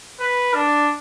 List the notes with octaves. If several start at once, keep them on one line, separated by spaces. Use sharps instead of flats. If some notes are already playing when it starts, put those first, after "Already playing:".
B4
D4